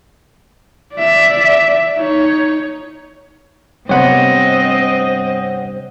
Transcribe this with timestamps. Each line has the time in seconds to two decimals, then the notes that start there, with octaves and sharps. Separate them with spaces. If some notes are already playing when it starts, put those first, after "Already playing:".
0.95 D5 E5
1.98 D#4 C#5
3.89 G2 C3 B3 C4 C5 C#5 D#5 F#5